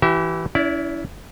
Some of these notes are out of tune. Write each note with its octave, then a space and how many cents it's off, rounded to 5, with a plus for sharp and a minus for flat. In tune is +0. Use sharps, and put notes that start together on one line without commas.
E3 +0 G4 -40 E5 +0
C#4 +40 E4 +0 D5 -15